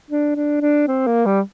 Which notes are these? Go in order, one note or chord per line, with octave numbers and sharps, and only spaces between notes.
D4
D4
D4
C4
A#3
G3